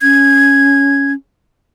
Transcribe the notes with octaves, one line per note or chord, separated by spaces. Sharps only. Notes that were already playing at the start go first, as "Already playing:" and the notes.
C#4 G#6